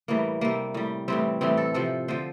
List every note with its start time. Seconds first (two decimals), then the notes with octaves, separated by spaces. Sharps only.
0.08 A2 E3 G3 A#3
0.41 C3 G3 A#3
0.74 A2 G3
1.08 A2 E3 G3 C4
1.41 A2 E3 G3 C4
1.57 A4
1.74 C3 F3 A4
2.08 D3 F3 C5